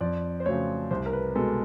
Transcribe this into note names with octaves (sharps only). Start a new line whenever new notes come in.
F2 D5
C5
C#3 F#3 A3 C#5
C2 C5
A#4
B4
B2 G#3 A4